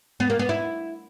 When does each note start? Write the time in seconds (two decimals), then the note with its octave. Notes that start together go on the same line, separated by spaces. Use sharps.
0.20 B3
0.30 A#3
0.39 B3
0.49 E4